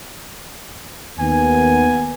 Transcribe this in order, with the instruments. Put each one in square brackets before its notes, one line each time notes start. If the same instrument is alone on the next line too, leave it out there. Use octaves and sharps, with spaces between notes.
[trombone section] D#2 [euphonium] B3 [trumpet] G#5